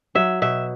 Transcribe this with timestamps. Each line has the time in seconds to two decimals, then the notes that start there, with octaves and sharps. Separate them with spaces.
0.15 F#3 E5
0.42 B2 E5